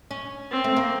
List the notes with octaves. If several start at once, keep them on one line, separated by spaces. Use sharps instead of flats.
C#4
C4
A3
A#3